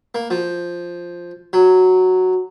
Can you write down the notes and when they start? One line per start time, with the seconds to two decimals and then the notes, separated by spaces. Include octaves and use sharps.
0.15 A#3
0.30 F3
1.53 F#3